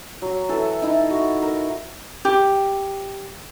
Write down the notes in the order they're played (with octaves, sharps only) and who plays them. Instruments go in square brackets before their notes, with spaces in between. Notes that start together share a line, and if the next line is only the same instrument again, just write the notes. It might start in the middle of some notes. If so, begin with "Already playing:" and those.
[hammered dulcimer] F#3
E3 A4
D#4 E4
F#4
A#4
[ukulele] G4